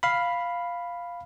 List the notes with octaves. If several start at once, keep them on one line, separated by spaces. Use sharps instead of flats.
F5 B5